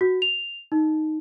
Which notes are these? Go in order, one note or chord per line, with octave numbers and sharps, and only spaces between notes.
F#4
F7
D#4